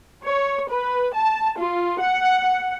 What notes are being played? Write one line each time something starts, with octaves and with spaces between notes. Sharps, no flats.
C#5
B4
A5
F4
F#5